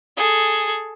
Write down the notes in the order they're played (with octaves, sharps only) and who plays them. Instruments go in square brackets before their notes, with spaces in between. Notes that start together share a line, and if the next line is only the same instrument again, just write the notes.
[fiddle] G#4 A4